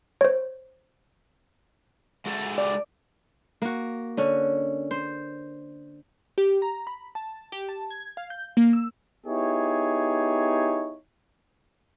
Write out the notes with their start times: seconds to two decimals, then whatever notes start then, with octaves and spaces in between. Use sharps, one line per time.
0.21 C5 C#5
2.26 G#3 F#4 A4
2.58 D5
3.62 A#3 F#4
4.17 D3 C#4
4.91 C5
6.38 G4
6.62 A#5
6.87 B5
7.15 A5
7.52 G4
7.69 A5
7.91 G#6
8.17 F5
8.30 G6
8.57 A#3
8.73 E6
9.26 B3 D#4 E4 G4 G#4 C#5